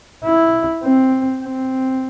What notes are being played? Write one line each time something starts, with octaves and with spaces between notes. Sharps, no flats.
E4
C4
C4